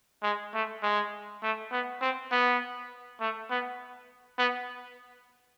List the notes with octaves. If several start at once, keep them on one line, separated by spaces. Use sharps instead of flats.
G#3
A3
G#3
A3
B3
C4
B3
A3
B3
B3